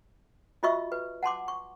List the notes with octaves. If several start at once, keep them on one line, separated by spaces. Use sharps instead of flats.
F4 F#4 D#5 E5 C#6 E6
B4
F#5 A5 C6 D6
C#6